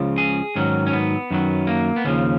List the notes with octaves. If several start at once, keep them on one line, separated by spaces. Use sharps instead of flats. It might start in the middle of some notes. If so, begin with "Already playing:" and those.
Already playing: C#2 C#3 F3
G#4
G#2 D#3 F#3 C#4
C#4
B3
F#2 D#3 F#3
A#3
B3
D#2 C#3 F3 C#4